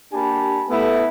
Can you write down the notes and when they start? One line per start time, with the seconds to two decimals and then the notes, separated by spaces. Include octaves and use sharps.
0.12 A#3 D4 G4 G#5 A5 B5
0.69 A3 B3 E4